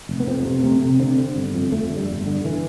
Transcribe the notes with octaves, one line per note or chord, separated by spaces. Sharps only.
F1
B3
F2 C4
C3
C3 A3
C3
D3 C4
D3
G1
F2
F2 A3
D3
G3
G1
D3
D3 E3